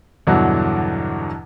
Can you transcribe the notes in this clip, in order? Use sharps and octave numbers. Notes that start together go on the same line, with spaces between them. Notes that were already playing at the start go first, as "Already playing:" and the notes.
E2 G2 B2 D3 E3 F#3